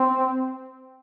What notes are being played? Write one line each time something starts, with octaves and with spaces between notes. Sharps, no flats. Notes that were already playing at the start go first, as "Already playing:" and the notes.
Already playing: C4